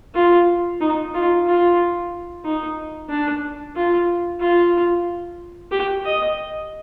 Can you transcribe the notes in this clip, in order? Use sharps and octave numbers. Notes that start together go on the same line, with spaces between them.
F4
D#4
F4
F4
D#4
D4
F4
F4
G4
D#5